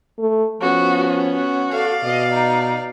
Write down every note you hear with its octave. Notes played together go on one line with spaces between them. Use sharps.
A3
F3 B3 C#4 F#4
F#4
A4 D5 F5
B2 D#5
D#4